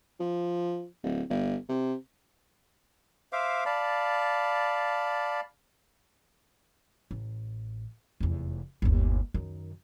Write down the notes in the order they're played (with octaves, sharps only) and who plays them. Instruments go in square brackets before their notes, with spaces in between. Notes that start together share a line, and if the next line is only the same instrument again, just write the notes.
[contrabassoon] F3
D1
G1
C3
[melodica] C5 E5 F5 D6
D5 F5 A5 B5
[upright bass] A1
F1 E2
G1 D#2
F#2 D#3